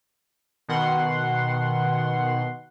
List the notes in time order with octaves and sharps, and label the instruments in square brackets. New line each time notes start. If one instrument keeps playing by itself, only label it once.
[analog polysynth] B2 D#3 F#5 C6